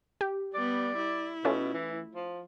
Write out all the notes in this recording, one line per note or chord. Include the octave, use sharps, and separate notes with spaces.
G4
G3 B3 D5
E4
B2 A3 C#4 F4
E3
F3